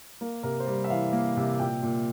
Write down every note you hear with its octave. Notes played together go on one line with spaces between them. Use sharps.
A#3 A#4
C3 A#4
C5
G3 A#4
E5
E3 F5
A#3
C3
A#2 G5
A#2